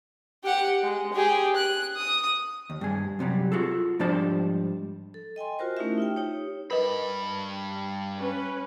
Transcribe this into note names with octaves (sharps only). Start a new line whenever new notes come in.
G4 F#5
G#3
G4 G#4
F#6
D#6
D#2
G2 G#4
F#2 C3 F#3 G3
F4 F#4 G#4 A4
G#2 F3 G3 D4 C5 A5
A4
D#5 G5 G#5 C6
F4 F#4 A#4 C5
A3 C#4 D#4 E4 G4 E5
D#4 F4 G5
D#4 G4 C#5
G2 A#4 B4 D#5 B5
C#4 B4